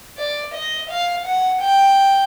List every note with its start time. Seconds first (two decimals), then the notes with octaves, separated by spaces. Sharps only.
0.18 D5
0.54 D#5
0.90 F5
1.26 F#5
1.62 G5